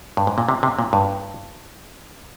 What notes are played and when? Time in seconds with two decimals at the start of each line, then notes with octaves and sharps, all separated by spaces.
0.17 G2
0.27 G#2
0.38 A#2
0.49 C3
0.63 C3
0.79 A#2
0.93 G2